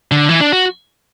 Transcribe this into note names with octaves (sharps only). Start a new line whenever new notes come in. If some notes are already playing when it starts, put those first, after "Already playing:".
D3
E3
D4
F#4